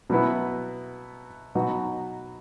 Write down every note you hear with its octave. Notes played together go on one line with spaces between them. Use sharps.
B2 F#3 B3 E4
B2 F#3 B3 D#4 F#4